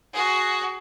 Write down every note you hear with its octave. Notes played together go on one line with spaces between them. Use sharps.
F#4 G#4